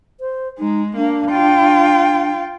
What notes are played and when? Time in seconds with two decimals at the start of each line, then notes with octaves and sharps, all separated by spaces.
0.20 C5
0.59 G#3 D#4
0.97 A#3 D4
1.31 F4 G5